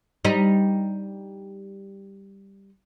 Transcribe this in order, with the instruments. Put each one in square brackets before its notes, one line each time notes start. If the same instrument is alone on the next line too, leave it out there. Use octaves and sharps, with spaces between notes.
[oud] G3 D#4